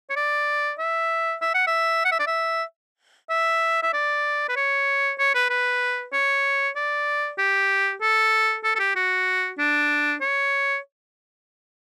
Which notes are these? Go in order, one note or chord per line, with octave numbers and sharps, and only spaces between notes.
C#5
D5
E5
E5
F#5
E5
F#5
E5
D5
E5
E5
E5
D5
B4
C#5
C#5
B4
B4
C#5
D5
G4
A4
A4
A4
G4
F#4
D4
C#5